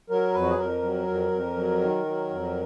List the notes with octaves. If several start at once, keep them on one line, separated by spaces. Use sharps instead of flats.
F#3 A#4
F2 B4
F#4
G#4
F2 A#4
F#3
F2
F2
F#3
D#3
F#3
F2